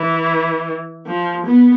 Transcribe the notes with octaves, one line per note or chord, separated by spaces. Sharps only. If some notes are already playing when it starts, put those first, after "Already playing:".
Already playing: E3
F3
B3